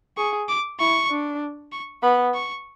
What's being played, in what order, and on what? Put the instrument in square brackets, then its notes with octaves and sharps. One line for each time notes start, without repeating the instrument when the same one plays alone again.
[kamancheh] G#4 [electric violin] C#6
[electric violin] D6
[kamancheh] E4 [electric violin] C#6
[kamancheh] D4
[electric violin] C#6
[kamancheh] B3 [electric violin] B5
[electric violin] C#6